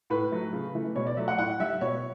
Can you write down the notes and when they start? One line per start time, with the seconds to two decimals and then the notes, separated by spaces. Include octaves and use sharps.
0.10 A2 B4
0.32 F#3 A3
0.53 C#3
0.74 E3 A3
0.96 B2 C#5
1.07 D5
1.17 F#3 A3 E5
1.28 F#5
1.38 A2 F#5
1.60 G3 E5
1.81 B2 C#5